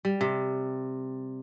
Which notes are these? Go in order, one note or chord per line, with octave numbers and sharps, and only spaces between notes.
G3
C3